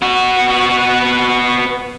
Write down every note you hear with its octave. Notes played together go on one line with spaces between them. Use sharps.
B3 F#4